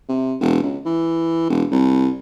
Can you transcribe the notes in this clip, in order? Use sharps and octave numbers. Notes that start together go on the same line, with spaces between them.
C3
E1
C#2
E3
E1
C2